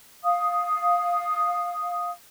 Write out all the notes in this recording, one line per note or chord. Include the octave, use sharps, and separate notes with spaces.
F5 D#6